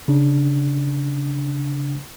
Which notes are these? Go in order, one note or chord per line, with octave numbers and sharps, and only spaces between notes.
C#3 D4